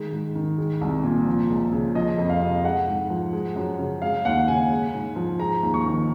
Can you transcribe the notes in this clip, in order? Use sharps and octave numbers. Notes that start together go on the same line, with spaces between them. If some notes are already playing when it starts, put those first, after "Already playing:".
Already playing: D#3 G#3
G#2
D#3
G#3
C2
A#2
F3
C#2
C#3
F3 D#5
F2
F5
C3
G#3 F#5
G#2
F3
G#3
F#2
C#3
G#3 F5
D#2 F#5
C#3 G#5
G#3
G#2
F3
G#3 A#5
D#2
C#6
D#3